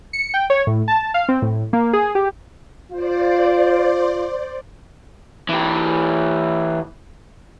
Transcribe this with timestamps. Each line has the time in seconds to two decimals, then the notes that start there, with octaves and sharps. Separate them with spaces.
0.13 C#7
0.34 G5
0.50 C#5
0.67 A2
0.88 A5
1.14 F5
1.29 C4
1.42 A2
1.73 A#3
1.93 G#4
2.15 G4
2.92 F4 C5 D5
5.49 E3 G4